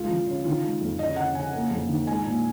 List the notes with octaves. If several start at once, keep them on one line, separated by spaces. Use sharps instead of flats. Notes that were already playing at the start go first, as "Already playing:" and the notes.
Already playing: C#2 F4
F3
C#3
D#3 F4
G#3
F2
C#3 D#5
C#3 F#5
C#3 G#5
A#3
F2
D#3
G#3 G#5
A#2